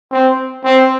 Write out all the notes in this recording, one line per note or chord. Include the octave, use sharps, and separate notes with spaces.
C4
C4